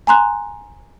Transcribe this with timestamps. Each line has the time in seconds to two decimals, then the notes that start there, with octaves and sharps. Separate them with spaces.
0.07 G#5 A#5 C6 F#6